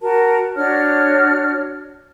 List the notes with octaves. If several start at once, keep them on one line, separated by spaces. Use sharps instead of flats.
F#4 A#4 A5
D4 F#4 C#5 F6